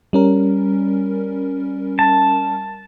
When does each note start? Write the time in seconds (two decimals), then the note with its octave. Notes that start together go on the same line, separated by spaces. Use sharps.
0.13 G3 C#4 A#4
1.99 A5